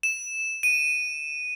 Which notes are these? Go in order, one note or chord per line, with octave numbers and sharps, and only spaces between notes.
E7
D#7